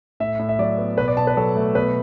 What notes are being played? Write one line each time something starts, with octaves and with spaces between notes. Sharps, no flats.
A2 E5
A2
E5
F#3 D5
B3
B2 B4
D5
B2 A5
B4
F#3 A4
A3
B2 B4